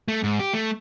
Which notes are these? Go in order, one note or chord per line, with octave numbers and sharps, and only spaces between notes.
A3
G#2
G4
A3